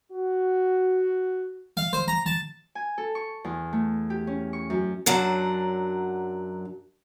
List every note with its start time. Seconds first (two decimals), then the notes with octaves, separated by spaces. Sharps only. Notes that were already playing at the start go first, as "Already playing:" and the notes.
0.12 F#4
1.77 F5
1.93 C5
2.08 A#5
2.26 A5
2.75 G#5
2.98 A4
3.15 C#6
3.45 E2
3.73 A3
4.10 G4
4.27 C#4
4.53 C#6
4.70 F#2
5.06 F#2 F#3 D4 F#5